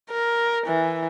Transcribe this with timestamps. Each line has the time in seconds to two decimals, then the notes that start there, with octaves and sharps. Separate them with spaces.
0.10 A#4
0.66 E3